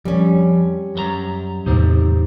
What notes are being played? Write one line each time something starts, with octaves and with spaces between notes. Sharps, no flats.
F2 G3 C#4
F#2 A#4 A#5
E2 A2 C3 D#4 G4 C5